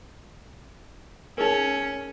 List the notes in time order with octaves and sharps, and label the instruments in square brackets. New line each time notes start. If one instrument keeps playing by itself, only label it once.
[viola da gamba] C#4 [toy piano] D#4 G#4 A#4